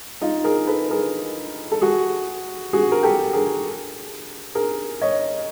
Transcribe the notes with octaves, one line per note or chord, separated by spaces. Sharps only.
D#4 F4
G#4 A#4
A4 B4
G#4 A#4
A4
F#4 G#4
F#4 G#4
A#4
G4 A4
G#4 A#4
G#4 A#4
C#5 D#5